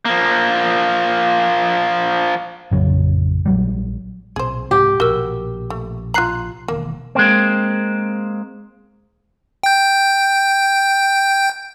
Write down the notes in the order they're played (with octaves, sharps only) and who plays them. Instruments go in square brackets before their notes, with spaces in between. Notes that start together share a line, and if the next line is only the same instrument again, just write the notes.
[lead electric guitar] F3 A#3
[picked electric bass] A1 F2 C#3 F#3
A#1 F#3 G3
[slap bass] B1 A#2 C4 [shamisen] G#4 C5
[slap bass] C2 G#2 C4 [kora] G4
[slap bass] A#1 B2 [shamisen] F#4 [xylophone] A#4 E6
[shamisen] A3
[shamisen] F4 A#5 [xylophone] F#6 C7 F#7
[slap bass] E1 D#3 B3 [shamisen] A#3
[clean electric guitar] G#3 A#3 C4
[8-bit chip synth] G5 G6